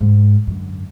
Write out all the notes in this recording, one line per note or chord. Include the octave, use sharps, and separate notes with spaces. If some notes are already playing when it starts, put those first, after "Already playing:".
G#2
F#2 D3